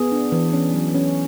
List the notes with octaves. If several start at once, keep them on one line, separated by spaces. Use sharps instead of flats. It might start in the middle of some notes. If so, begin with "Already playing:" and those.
Already playing: B3 G#4
D4
E3
C#4
F#3
C#4